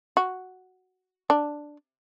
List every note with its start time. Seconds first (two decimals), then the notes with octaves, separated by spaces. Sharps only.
0.17 F#4
1.30 D4